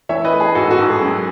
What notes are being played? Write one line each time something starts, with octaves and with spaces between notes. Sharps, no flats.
E3 C#5 E5
B4 D#5
A3
G#4
G#2 F#4 A4
F#4 A4
G#2
G#4
F#2 G#4